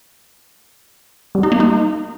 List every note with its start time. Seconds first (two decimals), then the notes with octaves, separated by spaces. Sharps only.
1.35 G3
1.43 D#4
1.52 A#3
1.60 D#4